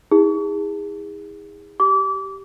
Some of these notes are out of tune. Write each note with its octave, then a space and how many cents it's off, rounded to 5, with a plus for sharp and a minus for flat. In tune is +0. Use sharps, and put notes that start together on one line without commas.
E4 -45 G#4 -30
G4 -15 D6 -25